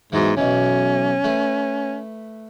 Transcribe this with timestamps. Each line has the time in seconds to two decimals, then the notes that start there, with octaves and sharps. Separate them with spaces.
0.12 G#2 E3 F#3 B3
0.37 B1 B2 E3 C#4
1.24 A3 B4